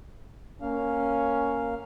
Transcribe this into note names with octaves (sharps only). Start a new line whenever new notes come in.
A#3 C#4 F5